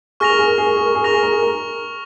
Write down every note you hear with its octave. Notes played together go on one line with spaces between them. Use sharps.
G#4 C#6 F6 A#6 F7
A#4
G#4
A#4
G#4
A#4
G#4
A#4
G#4
A#4 C#6 F6 A#6 F7
G#4
A#4
G#4
A#4